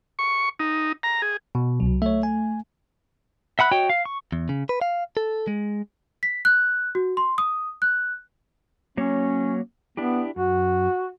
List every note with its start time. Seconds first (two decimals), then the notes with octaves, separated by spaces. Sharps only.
0.19 C#6
0.60 D#4
1.03 A#5
1.22 G#4
1.55 B2
1.80 C2 F#3
2.02 A3 C#5 E5
2.23 G#5
3.59 E5 F#5 B5 F#6
3.71 F#4 C#5 D#5 G5
3.90 F5
4.05 C#6
4.32 E2
4.49 C#3
4.69 B4
4.82 F5
5.17 A4
5.48 G#3
6.23 B6
6.45 F#6
6.95 F#4
7.17 C6
7.38 D#6
7.82 F#6
8.97 F#3 A#3 C#4 C#5
9.97 B3 D4 E4 G4
10.36 F#2 F#4